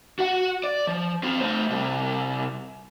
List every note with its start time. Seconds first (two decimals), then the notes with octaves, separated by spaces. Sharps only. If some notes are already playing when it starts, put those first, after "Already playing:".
0.19 F#4 F#5
0.64 D5
0.87 F3
1.23 C4 F4
1.40 A3 C5
1.70 C3 G3